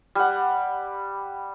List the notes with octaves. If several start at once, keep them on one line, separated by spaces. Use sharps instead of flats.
G3 F#5